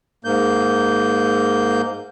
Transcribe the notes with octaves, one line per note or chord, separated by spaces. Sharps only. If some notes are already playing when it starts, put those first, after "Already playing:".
G#2 A#3 G6